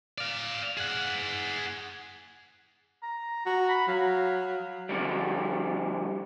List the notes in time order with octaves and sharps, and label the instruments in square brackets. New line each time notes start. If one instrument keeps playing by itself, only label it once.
[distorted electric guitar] D5 F5
G#4 F#5
[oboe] A#5
[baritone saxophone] F#4 [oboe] A#5
[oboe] B5
[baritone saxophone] F#3 [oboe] F5
[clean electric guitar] D3 F3 G3